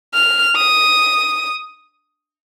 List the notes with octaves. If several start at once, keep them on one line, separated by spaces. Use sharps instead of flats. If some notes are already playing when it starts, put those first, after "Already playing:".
F6
D#6